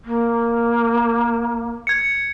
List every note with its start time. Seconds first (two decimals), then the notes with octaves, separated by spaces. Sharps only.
0.05 A#3
1.87 G#6 C#7